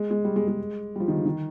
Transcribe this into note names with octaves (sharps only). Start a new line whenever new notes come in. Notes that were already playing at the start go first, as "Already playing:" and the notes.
Already playing: G#3
G#3
G3
G#3
G#3
G3
F3
D#3
D3
D#3